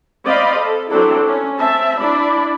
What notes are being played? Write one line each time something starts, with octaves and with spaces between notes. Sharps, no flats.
C4 D5 D#5 F5 B5
A4
F#3 C4 D4 E4 A4
C#4
C4 E5 A5
D4 E4 D5 B5